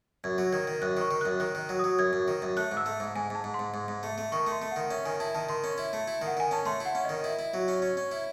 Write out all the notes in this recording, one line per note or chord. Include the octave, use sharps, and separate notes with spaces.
F#2 G#6
F#3
D#3 G#6
D#3
F#2 F#6
D#3 C#6
D#3
F#2 F#6
D#3 F#6
D#3
F#3
F#3 D#6
F#2 G#6
F#2
D#3
F#2
A3 F#6
G#2
E6
A3
G#2
G#2 G#5
G#2 A5
G#2
C6
G#2
G#2
G#2
A3
A3
D#3 C#6
A3
C6
A3
D#3 F#5
C#4 E5
D#3 G#5
E4 A5
D#3 A5
D#3 C6
C#4
E4
A3
E4
D#3
F#5
D#3 G#5
C#4 A5
A3 C6
E4
F#5
C#4
D#3 D#5
E4
E4
F#3
C#4
C#4
C#4
E4